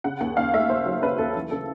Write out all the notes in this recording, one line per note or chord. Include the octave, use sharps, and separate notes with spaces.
C#3 F#5
D#2 F#5
D#2 F5
A3 E5
D#2 C5
F#3
C#3 B4
D#2 A4
E3
C#3 A4